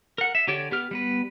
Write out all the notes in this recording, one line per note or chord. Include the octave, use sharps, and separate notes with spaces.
A#4 F#5
E5
D3 G4 C#5 D5
B3 G4 F6
G3 B3 B4